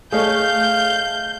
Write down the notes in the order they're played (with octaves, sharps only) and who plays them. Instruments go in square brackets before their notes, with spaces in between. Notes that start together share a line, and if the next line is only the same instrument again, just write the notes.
[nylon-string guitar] A3 C#5 [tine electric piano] G#4 D#5 [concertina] F5 [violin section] G6